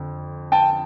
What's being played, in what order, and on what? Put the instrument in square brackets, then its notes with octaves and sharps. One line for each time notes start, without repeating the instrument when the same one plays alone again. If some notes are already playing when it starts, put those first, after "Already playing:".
Already playing: [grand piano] F2 D3
G5 A5